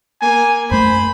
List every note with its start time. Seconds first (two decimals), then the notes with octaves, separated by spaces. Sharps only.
0.22 A#3 G#5
0.71 F#2 A3 C5 B5